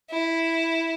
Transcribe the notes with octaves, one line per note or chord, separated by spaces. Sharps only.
E4